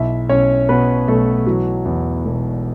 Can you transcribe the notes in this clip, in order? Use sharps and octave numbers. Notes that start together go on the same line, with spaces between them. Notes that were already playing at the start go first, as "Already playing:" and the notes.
Already playing: B1 E4 E5
B1 C#4 C#5
B2 B3 B4
B1 A3 A4
E3 F#3 F#4
E2
E1